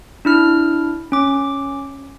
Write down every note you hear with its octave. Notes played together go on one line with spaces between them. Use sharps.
D4 E4 F6
C#4 D6